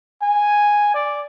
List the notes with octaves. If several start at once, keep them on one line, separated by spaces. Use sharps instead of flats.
G#5
D5